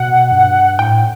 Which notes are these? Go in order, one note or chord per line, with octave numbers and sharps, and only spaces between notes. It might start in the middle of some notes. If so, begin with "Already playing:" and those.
Already playing: B2 F#5
G2
A2 G5